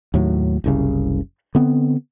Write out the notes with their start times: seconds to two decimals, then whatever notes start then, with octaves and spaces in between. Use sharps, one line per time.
0.14 D#2 A2 F#3
0.64 F#1 C2 C#3
1.55 D3 B3 C4